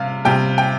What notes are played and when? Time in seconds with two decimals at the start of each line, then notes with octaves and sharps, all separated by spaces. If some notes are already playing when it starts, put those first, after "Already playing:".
Already playing: C3 G3 F5
0.25 C3 G3 G5
0.58 G5